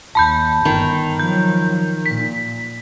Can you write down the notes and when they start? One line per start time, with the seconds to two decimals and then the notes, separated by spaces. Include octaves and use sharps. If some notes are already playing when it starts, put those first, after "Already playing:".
0.15 D#2 A5 B5 G6
0.65 G1 D#3
1.19 F3 F#3 G6
2.06 A#2 B6